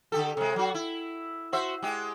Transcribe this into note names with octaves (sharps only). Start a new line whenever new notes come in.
D3 G4 A4
C3 G#3
F#3 F#4
E4
F#4 C5 E5
G#3 G4